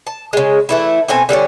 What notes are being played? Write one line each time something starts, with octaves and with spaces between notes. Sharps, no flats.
A5
C#3 G#3
E3 A3 E4
B2 A3 C4 G#5
D3 G3 B3 C#4